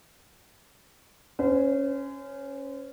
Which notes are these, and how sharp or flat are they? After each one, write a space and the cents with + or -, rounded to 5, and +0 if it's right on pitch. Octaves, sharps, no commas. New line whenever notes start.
C#4 +0 C5 -35